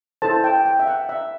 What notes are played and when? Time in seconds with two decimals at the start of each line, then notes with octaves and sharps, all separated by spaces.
0.22 E4 A4 C5 A5
0.44 G5
0.65 G5
0.79 E5
0.87 F#5
1.09 E5